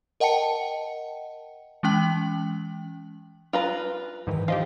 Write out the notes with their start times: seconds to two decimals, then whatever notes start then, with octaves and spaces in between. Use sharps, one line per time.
0.20 A#4 D#5 F#5 G5 A5 C#7
1.83 E3 G#3 C#4 G5 F#7
3.53 F4 B4 A#5
4.27 G#2 D#3 E3
4.48 F3 G4 D#5 F5